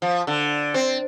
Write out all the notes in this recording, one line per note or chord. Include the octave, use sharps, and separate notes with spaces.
F3
D3
C4